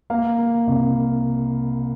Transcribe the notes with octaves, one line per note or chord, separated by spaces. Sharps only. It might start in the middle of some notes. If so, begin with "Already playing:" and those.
A#3 F5
A#3
C2